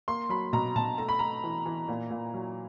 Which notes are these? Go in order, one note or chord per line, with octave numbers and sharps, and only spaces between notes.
A#3 C6
F#3 B5
B2 A#5
B2 A5
A3 A#5
B5
A3 A#5
E3
E3
A#2
A#2
F#3